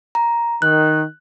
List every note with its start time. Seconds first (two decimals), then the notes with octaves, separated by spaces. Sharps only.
0.15 A#5
0.62 D#3 F#6